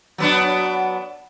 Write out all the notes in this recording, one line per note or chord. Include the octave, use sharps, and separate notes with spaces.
F#3 B3 D4